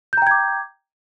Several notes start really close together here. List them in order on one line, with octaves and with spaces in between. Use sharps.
G6 A#5 G5 G#6 D6